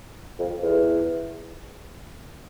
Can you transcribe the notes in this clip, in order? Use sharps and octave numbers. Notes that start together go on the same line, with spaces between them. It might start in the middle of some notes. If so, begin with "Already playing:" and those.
F2
E2